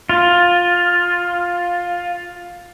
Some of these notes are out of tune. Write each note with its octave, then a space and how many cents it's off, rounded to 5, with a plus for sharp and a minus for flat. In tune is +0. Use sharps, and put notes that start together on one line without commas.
F4 +10